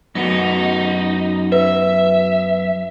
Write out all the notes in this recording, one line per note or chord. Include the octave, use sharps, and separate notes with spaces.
F#2 B3 D#4 F#4
B4 E5